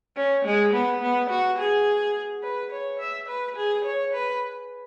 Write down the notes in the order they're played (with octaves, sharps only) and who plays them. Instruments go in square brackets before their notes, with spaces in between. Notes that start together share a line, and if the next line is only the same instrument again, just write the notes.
[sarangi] C#4
G#3
B3
B3
F#4
G#4
B4
C#5
E5
B4
G#4
C#5
B4